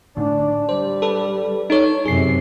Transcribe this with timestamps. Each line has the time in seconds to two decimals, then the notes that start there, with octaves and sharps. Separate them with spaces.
0.17 A2 D3 D4
0.69 G3 C5
1.02 A4 B4
1.70 D#4 A4 C#5
2.05 F#2 C3 G#4 C7